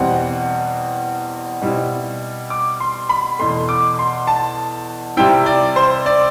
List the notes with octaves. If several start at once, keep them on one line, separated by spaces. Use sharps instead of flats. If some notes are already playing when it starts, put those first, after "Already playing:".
Already playing: E2 B2 G3 C4 F#5
B2 G3 C4 E4
D6
C6
B5
E2 B2 A3 C6
D6
C6
A5
C3 G3 C4 E4 G5
D5
C5
D5